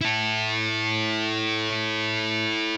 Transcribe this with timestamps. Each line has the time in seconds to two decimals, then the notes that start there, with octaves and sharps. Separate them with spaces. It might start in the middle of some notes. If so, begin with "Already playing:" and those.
0.01 E4 A4